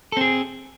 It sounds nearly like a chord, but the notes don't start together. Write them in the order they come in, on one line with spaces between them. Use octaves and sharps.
A4 C4 G#4